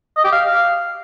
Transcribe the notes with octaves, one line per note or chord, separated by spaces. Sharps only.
D#5
G4
F5